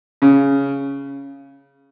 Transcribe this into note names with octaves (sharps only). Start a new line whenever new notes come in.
C#3